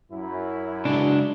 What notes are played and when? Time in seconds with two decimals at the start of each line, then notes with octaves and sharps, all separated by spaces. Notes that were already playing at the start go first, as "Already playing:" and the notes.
0.12 F#2 E4
0.85 C#3 G#3 D4